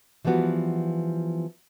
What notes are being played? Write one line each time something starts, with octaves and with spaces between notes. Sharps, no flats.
E3 F3 G3 B3 F#4